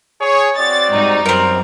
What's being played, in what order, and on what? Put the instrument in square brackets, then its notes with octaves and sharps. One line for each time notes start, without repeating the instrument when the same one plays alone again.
[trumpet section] G#4 C#5
[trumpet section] C4 F#4 D5 [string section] A6
[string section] G#2 G3 D#4
[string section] F#2 [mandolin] C4 A#4